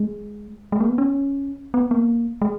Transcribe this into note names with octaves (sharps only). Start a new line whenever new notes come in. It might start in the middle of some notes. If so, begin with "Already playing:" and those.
Already playing: G#3
G#3
A#3
B3
C#4
B3
A#3
G#3